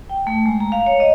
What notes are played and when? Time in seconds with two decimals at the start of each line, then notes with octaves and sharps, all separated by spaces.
0.09 G5
0.27 A3
0.46 G#3
0.60 A#5
0.72 F5
0.86 C#5
1.00 D#5